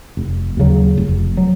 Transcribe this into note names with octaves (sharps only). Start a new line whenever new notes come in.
F1
D#2 C#3 F#3
F1
F#3